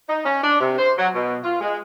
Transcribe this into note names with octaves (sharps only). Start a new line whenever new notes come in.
D#4
C#4
D4
C3
C5
F#3
B2
F4
G#3